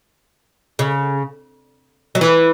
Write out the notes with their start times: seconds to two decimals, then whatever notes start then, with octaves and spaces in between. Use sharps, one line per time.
0.79 C#3
2.15 F#3
2.21 E3